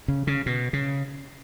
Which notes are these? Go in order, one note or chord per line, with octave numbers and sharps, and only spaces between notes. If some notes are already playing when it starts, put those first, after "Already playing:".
C#3
C#3
B2
C#3